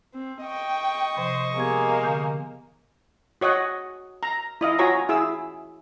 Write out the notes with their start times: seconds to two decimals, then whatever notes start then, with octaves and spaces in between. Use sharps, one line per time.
0.14 C4
0.43 D#5 G5 C#6
1.17 C3 F3 C5
1.56 G#3 A#3 B3 G4 G#6
2.03 D3 G6
3.41 F#4 C#5 D#5 F#5
4.23 A#5
4.61 E4 D#5 F5
4.79 F4 F#4 C#5 G#5 A#5
5.09 E4 G#4 E6